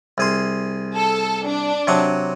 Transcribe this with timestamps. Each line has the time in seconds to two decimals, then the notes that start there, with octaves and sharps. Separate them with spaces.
0.18 C2 G#4 C6
0.96 A4
1.47 D4
1.87 C3 F#3 F#5